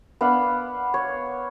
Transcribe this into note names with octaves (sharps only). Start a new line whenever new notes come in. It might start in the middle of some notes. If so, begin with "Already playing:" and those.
B3 D4 F5 B5
C#5